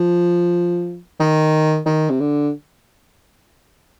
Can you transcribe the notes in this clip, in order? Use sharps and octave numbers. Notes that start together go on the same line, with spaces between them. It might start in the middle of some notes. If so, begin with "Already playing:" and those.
Already playing: F3
D#3
D#3
C3
D3